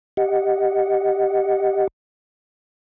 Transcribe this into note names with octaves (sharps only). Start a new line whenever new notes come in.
G4 D#5 F#5